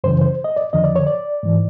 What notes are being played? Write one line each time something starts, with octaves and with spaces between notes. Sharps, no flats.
F#2 C#3 E3 C5
C5
D#5
D5
F2 D3 F3 D#5
D5
C#5
D5
G#2 E3